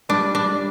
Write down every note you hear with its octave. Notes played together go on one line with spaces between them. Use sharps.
G3 D4
D4
G3